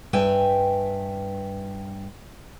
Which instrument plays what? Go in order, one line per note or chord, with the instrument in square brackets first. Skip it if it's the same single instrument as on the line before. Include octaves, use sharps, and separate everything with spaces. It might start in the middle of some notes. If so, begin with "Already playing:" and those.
[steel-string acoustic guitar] G2 B4 E5 G5 G#5